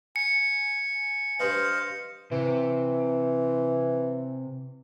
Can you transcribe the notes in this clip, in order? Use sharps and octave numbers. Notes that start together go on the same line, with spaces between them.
G#5 C#7
G2 G3 B4 C5 D#5 F5
C3 E3